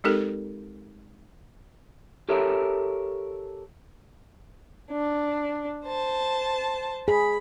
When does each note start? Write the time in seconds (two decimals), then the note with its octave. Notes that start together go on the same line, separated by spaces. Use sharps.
0.04 G#3 C4 D#4 G4 A4 A#4
2.29 G4 A4 A#4 C#5 E5
4.91 D4
5.86 C5 A5
7.08 G#4 B5